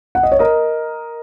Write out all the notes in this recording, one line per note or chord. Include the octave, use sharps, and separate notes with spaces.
F#5
D#5
C#5
A#4 D#5